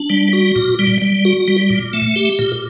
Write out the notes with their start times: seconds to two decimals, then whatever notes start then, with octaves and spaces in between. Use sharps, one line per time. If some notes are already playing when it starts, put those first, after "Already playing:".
Already playing: D4
0.10 G3
0.33 F#4
0.56 A#2
0.79 G3
1.02 G3
1.25 F#4
1.48 G3
1.70 A#2
1.93 A3
2.16 G4
2.39 A#2